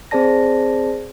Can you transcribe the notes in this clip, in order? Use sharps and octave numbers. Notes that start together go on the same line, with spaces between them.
C4 G#4 C5 D5 A5 A#6